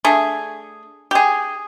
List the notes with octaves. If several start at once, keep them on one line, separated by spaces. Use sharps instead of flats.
A3 D4 G#4
G4 G#4